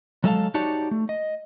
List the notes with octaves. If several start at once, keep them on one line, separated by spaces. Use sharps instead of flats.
F#3 G#3 A4 D#5 F5 A5
D#4 F#4 G4 C#5 D5 A5
A3
D#5